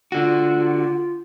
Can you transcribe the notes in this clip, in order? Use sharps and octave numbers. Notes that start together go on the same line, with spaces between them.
D3 F4 F#4